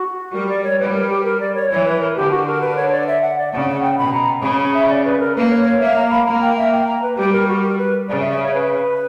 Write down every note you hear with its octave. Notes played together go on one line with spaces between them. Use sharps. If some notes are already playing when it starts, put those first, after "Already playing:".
Already playing: F#4
G3 A#4
D5
C#5
G3 B4
A#4
G4
A#4
D5
C#5
E3 C#5
B4
A#4
D3 G4
F#4
A#4
B4
C#5
D5
E5
F#5
D5
C#3 F#5
F#5
G5
B2 B5
A#5
C#3 B5
B5
E5
D5
B4
A#4
A#3 B4
C#5
C#5
A#3 E5
A#5
B5
A#3 A#5
G5
E5
G5
A#5
B4
G3 G4
A#4
F#4
A#4
B4
C#3 D5
E5
E5
C#5
B4